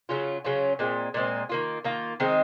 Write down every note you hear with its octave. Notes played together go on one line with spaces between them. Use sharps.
C#3 F#3 C#4 F4
C#3 F#3 C#4 F4
A#2 G#3 C4
A#2 G#3 C4
D#3 A#3 F4
D#3 A#3 F4
D#3 G#3 C4 D#4